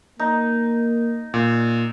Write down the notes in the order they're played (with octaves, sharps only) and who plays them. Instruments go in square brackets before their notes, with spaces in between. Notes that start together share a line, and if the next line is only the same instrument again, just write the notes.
[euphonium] A#3 [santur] D#4
[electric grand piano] A#2